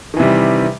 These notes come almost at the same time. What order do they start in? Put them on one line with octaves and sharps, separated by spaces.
D#3 E3 C3 G3